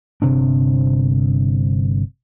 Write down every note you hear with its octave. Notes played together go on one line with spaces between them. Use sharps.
G1 C3 C4 D4